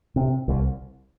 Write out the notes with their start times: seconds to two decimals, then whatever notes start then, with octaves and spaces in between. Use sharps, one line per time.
0.16 C3
0.48 C2